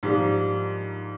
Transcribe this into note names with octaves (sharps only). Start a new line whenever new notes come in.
G#2 F3 G3 A#3 D4